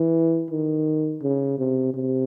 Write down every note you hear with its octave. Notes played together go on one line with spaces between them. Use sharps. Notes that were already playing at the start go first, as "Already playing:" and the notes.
Already playing: E3
D#3
C#3
C3
C3